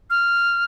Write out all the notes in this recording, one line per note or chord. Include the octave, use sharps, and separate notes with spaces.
F6